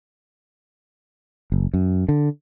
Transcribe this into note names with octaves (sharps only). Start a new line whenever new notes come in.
F#1
F#2
D3